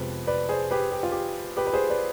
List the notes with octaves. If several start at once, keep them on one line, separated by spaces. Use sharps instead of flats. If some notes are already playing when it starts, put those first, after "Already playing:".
Already playing: F2 C3 F3 G#3 B3 B4
B4 D5
G#4 C5
G4 B4
G4
F4
G4
G4 B4
B4
G#4 C5
B4 D5